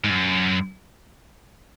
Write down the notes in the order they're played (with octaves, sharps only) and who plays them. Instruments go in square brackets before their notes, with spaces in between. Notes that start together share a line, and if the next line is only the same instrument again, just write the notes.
[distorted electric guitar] G#2
F#2